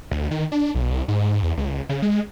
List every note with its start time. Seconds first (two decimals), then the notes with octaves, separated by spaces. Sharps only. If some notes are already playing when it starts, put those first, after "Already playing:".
0.11 D2
0.31 D#3
0.52 D4
0.75 B1
0.90 C2
1.08 G#2
1.42 E2
1.57 C#2
1.89 C#3
2.02 G#3